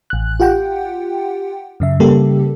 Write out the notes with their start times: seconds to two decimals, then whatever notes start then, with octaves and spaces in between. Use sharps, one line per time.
0.10 A1 F#6
0.40 F4 G4 F#5 G5
1.80 F#2 C#3 E5
2.00 C#3 G3 A#3 G4 A4